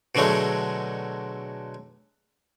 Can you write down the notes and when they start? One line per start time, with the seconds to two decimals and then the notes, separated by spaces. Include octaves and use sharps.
0.15 B2 D3 F#3 G#3 A3